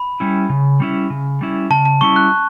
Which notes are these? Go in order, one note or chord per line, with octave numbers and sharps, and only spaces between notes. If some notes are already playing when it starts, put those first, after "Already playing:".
Already playing: B5
G3 C#4 E4
C#3
G3 C#4 E4
C#3
G3 C#4 E4
C#3 A5
A5
G3 C#4 E4 C#6
F#6